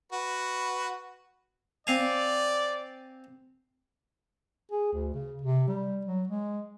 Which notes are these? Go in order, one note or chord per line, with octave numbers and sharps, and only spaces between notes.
F#4 B4
C4 D5 F5 G#5
G#4
D2
C#3
C3
G3
F#3
G#3